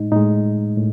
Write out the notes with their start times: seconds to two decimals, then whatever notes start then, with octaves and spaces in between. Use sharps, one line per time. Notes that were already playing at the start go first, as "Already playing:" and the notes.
Already playing: A2 G#3 D#4
0.12 A2 G#3 D#4
0.77 A2